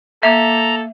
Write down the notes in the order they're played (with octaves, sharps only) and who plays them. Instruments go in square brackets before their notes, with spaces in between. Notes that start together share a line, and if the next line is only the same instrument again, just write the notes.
[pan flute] A#3 [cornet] A4 [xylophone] E5 [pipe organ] A#5